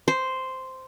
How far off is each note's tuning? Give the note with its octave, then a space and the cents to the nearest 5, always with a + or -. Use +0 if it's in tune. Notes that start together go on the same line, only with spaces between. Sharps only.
C5 -5